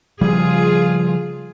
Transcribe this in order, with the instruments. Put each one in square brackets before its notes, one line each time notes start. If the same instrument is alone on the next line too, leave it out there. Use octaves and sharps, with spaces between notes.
[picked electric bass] C#3 F3 G3 [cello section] F4 G#4